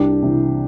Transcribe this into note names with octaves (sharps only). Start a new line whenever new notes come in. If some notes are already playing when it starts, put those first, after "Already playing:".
Already playing: C2 D4 G4
C3 E3